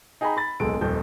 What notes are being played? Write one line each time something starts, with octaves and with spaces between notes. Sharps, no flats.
D#4 G#4 G5 G#5 A#5 B5
B5 A6
D1 B1 G#3 A4 D7
D#1 F2 A4 G6